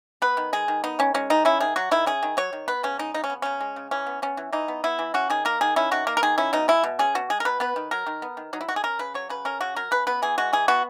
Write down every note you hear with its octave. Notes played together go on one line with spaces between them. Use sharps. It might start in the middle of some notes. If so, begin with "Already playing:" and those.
B3 B4
D#3
G#3 G#4
D#3
B3 D#4
D#3 C#4
G#3 C#4
D#3 D#4
C#4 E4
D#3 G#4
F#3 F#4
D#3 E4
C#4 G#4
D#3
F#3 C#5
D#3
B3 B4
C#3 C#4
G#3 D#4
C#3 D#4
C#4
B3
C#3 C#4
G#3
C#3
E3 C#4
B3
B3 C#4
E3
E3 D#4
B3
B3 E4
E3
C#4 F#4
D#3 G#4
A#3 A#4
D#3 G#4
C#4 E4
D#3 F#4
A#3 A#4
A#4
D#3 G#4
C#4 E4
B2 D#4
G#3 E4
B2
C#4 G#4
B2 F#4
G#3 G#4
A#4
B2 B4
B3 B4
D#3
F#3 A#4
D#3
B3
D#3
F#3 D#4
E4
D#3 F#4
G#4
C#4 A#4
C#3 B4
F#3 C#5
C#3 B4
C#4 A#4
C#3 F#4
F#3 A#4
C#3 B4
B3 B4
E3 G#4
G#3 F#4
E3 G#4
B3 F#4